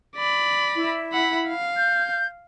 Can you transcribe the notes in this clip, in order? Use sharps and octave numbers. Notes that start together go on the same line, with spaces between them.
D5 B5
E4
F#5 B5
F5
G6